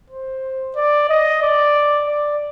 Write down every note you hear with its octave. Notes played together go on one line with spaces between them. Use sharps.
C5
D5
D#5
D5
D5